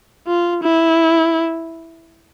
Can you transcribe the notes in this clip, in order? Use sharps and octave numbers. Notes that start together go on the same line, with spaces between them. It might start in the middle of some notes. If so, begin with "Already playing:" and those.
F4
E4